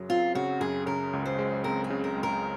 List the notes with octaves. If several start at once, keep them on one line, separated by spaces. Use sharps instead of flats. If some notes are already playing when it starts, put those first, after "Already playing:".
Already playing: F#2 C#3 F#3
C4 F4
C#3 F#4
F#2 G#4
C#3 A#4
C#2
C5
G#3
C4 A#4
G#4
C#3
A#4
C#2
A#4